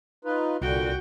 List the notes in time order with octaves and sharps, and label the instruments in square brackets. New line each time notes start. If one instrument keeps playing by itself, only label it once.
[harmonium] D#4 F4 B4
[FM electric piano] C2 [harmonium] A#2 D3 [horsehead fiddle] F#4 G5